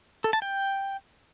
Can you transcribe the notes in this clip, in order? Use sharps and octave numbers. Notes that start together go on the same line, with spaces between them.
A4
A5
G5